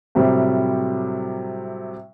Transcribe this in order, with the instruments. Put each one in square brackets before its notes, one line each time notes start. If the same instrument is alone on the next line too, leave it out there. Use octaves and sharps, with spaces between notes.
[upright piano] A2 C3 F#3 G3